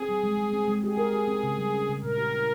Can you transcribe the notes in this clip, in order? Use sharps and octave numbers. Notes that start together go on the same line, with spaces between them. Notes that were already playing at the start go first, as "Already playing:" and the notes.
Already playing: C4 G#4
G3
G#3
G#3
C4
G#3
G4 G#4
A#4
G4
C4
C#3
G3
C#4
C#3
A#2 A#4
G4
E4